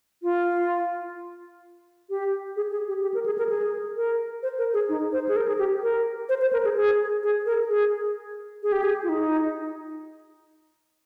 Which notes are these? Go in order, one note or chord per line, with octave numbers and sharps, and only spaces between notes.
F4
G4
G#4
G#4
G4
G4
A#4
G#4
A#4
G#4
A#4
C5
A#4
G#4
D#4
C5
G#4
A#4
G#4
G4
A#4
C5
C5
A#4
G#4
G#4
G#4
A#4
G#4
G#4
G4
G#4
F4
D#4